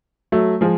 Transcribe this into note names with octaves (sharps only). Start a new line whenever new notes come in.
F#3 A3
F3 G#3